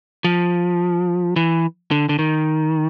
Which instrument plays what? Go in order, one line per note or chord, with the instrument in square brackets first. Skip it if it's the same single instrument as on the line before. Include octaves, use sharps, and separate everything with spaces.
[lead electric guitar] F3
E3
D3
D3
D#3